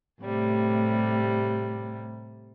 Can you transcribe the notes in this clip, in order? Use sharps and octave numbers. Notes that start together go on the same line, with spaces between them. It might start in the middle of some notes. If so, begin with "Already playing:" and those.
A2 C3 G3